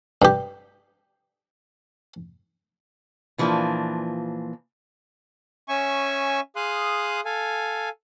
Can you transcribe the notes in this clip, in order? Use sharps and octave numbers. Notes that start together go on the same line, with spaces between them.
G2 G4
A#2 E3 F3 G3 A#3 D4
C#4 E5 G#5 C#6
G#4 F5 C6 D#6 F#6
A4 F5 G#5